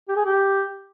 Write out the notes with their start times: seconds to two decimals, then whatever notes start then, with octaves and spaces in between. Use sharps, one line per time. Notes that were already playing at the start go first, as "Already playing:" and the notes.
0.09 G4
0.16 G#4
0.26 G4